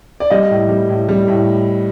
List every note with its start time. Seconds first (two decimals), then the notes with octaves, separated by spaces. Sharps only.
0.20 D5
0.30 G3 D#5
0.51 A2
0.69 G3
0.89 A2
1.09 G3
1.28 A2